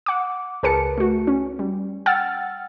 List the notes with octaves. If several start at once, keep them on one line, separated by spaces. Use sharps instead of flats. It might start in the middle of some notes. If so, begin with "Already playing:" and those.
F#5 D6
C#2 G#4 A#4 B4 A5 C#7
A3 F#4
C#4
G3
F#5 G5 E6 F6 A6